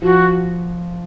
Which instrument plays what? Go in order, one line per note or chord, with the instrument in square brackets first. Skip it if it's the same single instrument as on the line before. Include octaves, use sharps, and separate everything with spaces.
[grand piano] F3 [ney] F#4